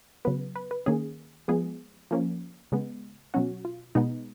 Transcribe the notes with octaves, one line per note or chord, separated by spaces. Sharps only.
C#3 F#3 B3 B4
B4
B4
D#3 A#3 C#4 G#4
F3 G#3 B3 G#4
F3 A#3 C#4
C#3 G#3 B3
B2 F#3 C#4 F#4
F4
B2 G#3 B3 D#4